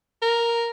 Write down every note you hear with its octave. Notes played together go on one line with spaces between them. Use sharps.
A#4